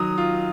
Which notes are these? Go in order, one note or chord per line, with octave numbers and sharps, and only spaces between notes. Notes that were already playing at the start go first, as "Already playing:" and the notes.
Already playing: D#3 F#3 D#6
F4